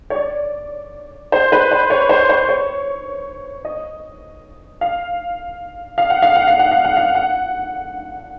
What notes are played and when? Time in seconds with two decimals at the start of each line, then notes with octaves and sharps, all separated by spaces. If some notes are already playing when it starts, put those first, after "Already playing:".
0.10 C#5
0.15 D5
1.32 C5
1.52 B4
1.72 C5
1.90 C#5
2.09 C5
2.29 C5
2.49 C#5
3.65 D#5
4.81 F5
5.98 F5
6.10 F#5
6.22 F5
6.36 F#5
6.47 F5
6.59 F#5
6.72 F5
6.85 F#5
6.97 F5
7.15 F#5